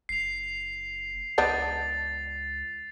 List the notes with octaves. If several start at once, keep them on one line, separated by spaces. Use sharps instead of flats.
F#1 C7 F7
C#2 B3 D4 D#4 A6